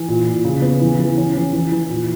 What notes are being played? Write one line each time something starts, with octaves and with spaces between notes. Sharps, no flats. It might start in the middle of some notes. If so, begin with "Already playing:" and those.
Already playing: E3
A#2
A#2
C#3
B3
E3
E3
C#4
E3
E3
E3
A#2